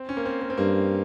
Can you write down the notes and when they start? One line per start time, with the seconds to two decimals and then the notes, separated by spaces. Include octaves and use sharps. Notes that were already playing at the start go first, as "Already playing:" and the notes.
Already playing: C4
0.09 C#4
0.17 A#3
0.26 C4
0.42 A#3
0.50 C4
0.58 G2 A#3